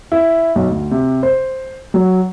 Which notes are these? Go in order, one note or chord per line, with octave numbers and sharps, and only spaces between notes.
E4
B1
D2
C3
C5
F#3